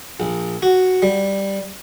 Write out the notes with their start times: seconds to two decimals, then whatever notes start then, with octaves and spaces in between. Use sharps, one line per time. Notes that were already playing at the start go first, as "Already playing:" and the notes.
0.20 A#1
0.62 F#4
1.02 G3